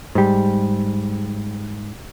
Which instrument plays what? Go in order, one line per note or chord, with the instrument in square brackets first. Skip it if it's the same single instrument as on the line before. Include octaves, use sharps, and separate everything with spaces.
[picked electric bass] G#2 G3